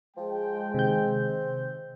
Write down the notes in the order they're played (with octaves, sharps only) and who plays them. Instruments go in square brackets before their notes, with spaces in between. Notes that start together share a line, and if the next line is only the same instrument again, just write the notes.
[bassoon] F3 [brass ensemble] G#3 G5
[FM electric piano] C3 D#3 G6 [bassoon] C4